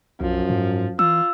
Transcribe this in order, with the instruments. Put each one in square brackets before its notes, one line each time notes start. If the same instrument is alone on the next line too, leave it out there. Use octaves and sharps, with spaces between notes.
[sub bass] B1 [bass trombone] F#2 [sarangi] F3
[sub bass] G#2
[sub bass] E3 [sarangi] F4 [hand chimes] E6